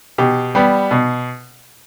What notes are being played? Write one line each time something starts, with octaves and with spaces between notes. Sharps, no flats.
B2 G4
G3 B3
B2